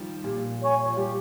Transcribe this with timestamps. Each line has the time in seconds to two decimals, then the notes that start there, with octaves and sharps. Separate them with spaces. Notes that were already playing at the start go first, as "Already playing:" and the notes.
Already playing: D#3 F3 G3
0.23 A#2 G4
0.61 C#5 G#5 C#6
0.85 F3
0.97 G3 G4